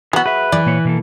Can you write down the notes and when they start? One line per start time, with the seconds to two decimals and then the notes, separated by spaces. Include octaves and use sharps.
0.13 E3 F#3 B3 F#4
0.26 G#4 B4 E5
0.52 E3 D5
0.66 A#2 A#3 C#5
0.85 B2 A#3 A4